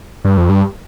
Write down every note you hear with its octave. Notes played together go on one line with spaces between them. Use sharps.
G2
F2
G2